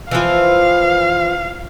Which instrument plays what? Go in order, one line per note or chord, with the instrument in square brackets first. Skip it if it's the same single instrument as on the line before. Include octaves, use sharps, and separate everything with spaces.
[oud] E3 F3 [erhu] F5